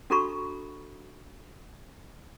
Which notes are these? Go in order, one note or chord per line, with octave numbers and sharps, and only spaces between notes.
D4 F#4 A4 A#5 B5 C#6